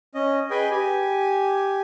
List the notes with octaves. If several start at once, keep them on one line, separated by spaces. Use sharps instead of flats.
C#4 D#5
G#4 B4 D#5 G5 G#5
G4 G#5